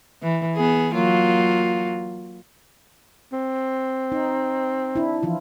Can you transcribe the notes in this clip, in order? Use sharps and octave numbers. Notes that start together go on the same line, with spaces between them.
E3
B3 G#4
F#3 A#3 F4
C4
D#4
D4 E4
E3 F3 F4